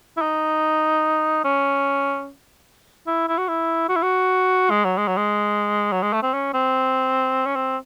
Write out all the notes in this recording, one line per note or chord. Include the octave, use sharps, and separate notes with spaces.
E4
D#4
C#4
E4
E4
F#4
E4
F#4
E4
F#4
G#3
F#3
G#3
F#3
G#3
F#3
G#3
A3
C4
C#4
C4
C#4
C4